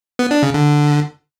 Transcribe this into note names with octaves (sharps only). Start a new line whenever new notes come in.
B3
D4
C#3
D3